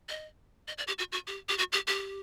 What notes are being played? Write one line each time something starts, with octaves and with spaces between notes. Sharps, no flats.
D#5
D#5
D5
G4
F#4
F#4
G4
G4
F#4
G4
G4